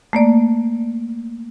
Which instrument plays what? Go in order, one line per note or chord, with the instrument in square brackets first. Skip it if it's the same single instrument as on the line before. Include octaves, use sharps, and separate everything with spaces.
[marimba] A3 A#3 D5